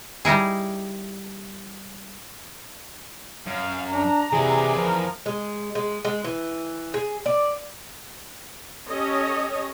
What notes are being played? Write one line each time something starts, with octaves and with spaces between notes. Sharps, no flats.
G3 D#4 E4 G#4
F#2 F5
D4 A#5
C3 E3 G#4 D5
F3 A#4
G#3
G#3
G#3
E3
G#4
D5
C#4 G4 A4 C#5 D#5